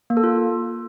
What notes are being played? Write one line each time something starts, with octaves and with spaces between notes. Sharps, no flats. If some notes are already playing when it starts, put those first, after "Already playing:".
A#3
A4
F4